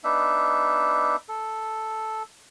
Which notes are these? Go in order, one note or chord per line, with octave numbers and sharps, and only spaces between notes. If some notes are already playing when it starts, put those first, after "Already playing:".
B3 D4 D#4 E5
A4